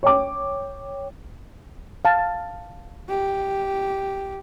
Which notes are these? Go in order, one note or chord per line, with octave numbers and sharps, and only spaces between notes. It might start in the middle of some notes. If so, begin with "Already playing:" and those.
C#5 G5 D6
F5 A5
G4